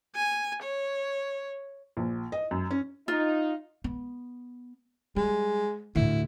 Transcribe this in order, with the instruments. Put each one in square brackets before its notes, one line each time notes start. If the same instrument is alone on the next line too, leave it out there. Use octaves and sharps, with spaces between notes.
[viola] G#5
C#5
[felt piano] A#1
D#5
F#2
C#4
[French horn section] D#4 [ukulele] F4
[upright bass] B3
[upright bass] G3 [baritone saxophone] G#3
[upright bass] D2 A2 [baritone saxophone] E4